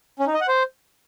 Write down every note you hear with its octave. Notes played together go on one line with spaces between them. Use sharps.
C#4
D#4
D#5
F#5
C5